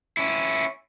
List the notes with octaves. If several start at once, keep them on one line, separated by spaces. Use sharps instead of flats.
C#4 E4